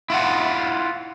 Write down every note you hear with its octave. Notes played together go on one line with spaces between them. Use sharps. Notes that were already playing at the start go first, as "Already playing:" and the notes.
E4 F4 F#5